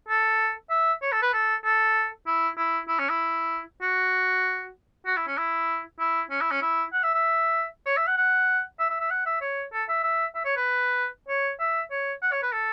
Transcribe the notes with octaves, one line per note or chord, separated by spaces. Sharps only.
A4
E5
C#5
A4
B4
A4
A4
E4
E4
E4
C#4
E4
F#4
F#4
E4
C#4
E4
E4
C#4
E4
C#4
E4
F#5
E5
E5
C#5
E5
F#5
F#5
E5
E5
E5
F#5
E5
C#5
A4
E5
E5
E5
C#5
B4
C#5
E5
C#5
F#5
C#5
B4
A4